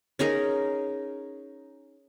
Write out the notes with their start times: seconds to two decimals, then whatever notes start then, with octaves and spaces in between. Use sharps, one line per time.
0.19 C#4 D#4 G#4 A#4